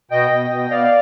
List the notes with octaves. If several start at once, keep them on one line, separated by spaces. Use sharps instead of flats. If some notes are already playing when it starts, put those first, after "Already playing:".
B2 D#5 G5
B2
B2
B2 D5 F5